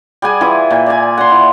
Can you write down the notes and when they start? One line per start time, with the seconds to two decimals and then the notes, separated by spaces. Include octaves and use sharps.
0.22 G3 G#4 F#5 G#5
0.41 E3 F4 E5
0.70 A#2
0.86 D5 F5 G#5
1.17 F#5 C6
1.31 E4